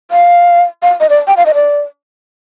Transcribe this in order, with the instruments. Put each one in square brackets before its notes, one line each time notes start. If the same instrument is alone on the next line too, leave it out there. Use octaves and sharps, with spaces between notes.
[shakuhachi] F5
F5
D#5
D5
G5
F5
D#5
D5